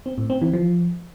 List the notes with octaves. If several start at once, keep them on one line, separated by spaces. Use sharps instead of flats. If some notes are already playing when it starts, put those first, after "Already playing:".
C4
A2
C4
E3
F3